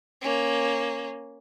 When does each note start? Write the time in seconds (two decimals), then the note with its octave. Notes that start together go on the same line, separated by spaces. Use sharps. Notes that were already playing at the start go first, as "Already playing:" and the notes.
0.22 A#3 C#4